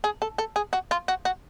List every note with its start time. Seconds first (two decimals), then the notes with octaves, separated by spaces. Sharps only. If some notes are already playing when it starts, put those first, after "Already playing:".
0.04 G#4
0.22 A4
0.38 A4
0.56 G#4
0.73 F#4
0.91 F4
1.08 F#4
1.25 F#4